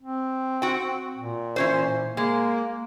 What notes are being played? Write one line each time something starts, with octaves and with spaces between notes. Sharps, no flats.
C4
F#4 G5
A#2
E3 C#4 C5
G#3 A#3